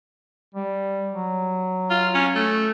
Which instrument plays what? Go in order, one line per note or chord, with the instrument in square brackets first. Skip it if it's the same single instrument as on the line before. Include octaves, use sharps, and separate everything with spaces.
[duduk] G3
F#3
[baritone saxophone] F4
C#4
A3